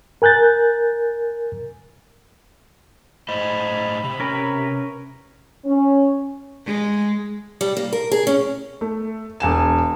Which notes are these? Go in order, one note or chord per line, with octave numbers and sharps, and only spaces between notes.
A#4 G#5 F#6 G6 A6
A2 C5 D#5 B5
C3
C#4 A#4 B4
C#4
G#3
G3
A#3
A#4
G#4
C#4
A3
E1 G#5 E7